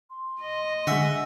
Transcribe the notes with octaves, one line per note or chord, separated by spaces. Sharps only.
C6
D#5
D3 G#3 F#4 E5 G#5